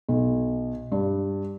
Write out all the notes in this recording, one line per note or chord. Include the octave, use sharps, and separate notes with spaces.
B1
G2